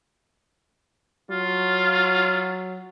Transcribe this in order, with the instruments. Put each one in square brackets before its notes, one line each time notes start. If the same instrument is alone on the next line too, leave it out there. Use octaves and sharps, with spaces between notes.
[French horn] F#3 [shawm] F4